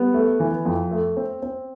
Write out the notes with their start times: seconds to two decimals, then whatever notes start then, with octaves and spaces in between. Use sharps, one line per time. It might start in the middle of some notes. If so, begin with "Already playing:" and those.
Already playing: G3 B3
0.14 A3
0.40 E3
0.65 F2
0.91 A3
1.17 C4
1.42 C4